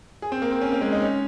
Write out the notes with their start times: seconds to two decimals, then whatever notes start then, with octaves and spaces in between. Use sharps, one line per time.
0.22 G#4
0.32 C4
0.42 A#3
0.52 C4
0.61 C#4
0.72 A#3
0.81 G#3
0.93 D#4
1.02 C#4